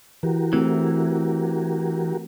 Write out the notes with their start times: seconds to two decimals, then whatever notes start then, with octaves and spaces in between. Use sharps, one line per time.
0.23 E3 F#4 G4 A#4
0.53 E3 A3 C4